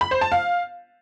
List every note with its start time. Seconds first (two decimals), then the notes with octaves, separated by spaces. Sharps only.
0.01 B5
0.11 C5
0.21 A5
0.32 F5